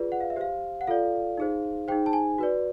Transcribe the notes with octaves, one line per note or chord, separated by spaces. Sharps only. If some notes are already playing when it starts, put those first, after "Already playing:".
Already playing: F4 G#4 B4 D5
F#5
F5
E5
G4 C5 F5
F#5
F4 A4 D5 F5
D#4 G#4 C5
D#4 G#4 C5 G5
A5
G#5
F#4 B4 D5